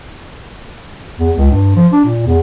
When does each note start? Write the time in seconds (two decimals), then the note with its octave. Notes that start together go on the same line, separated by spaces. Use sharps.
1.20 E2
1.38 C#2
1.51 G2
1.76 F3
1.93 D4
2.05 A#2
2.27 E2